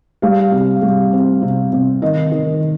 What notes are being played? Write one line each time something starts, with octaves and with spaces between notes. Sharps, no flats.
G3 F5
C3
G3
C4
C3
C3
D#3 D#5
D#3